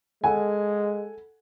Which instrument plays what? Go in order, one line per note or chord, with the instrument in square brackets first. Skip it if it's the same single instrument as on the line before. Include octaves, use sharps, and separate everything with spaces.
[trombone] G#3 [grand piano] A4 F#5 G#5